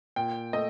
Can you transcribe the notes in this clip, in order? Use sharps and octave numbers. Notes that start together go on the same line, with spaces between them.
A#2 G5
A3 D#5